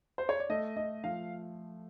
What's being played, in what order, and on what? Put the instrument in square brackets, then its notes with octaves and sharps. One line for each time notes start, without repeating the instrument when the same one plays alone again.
[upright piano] C5
C#5
D5
[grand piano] A3 [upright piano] D#5
[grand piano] A3 [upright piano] D#5
[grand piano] F3 [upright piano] F5